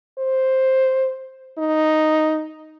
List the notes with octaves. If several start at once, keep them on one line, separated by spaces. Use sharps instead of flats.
C5
D#4